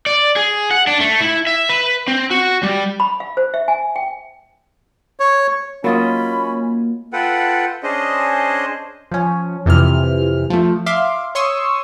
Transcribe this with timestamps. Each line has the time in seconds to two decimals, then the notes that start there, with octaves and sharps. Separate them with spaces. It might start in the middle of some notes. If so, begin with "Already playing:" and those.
0.06 D5
0.36 G#4
0.71 F#5
0.87 D4
1.00 A3
1.20 E4
1.47 E5
1.69 B4
2.08 C4
2.31 F#4
2.63 G3
3.00 B5
3.20 F5
3.37 C5
3.54 E5
3.68 G#5
3.96 G5
5.20 C#5
5.84 F#3 A#3 C#4 F4 D#5 B5
7.13 F4 A4 B4 F#5 G5
7.83 C#4 D4 G#4 C5 D#5
9.11 F3 C#4
9.66 F2 C3 E3 F6
10.50 F3 A3
10.86 E5 F5 C6 D6
11.35 C#5 C6 C#6 D#6 E6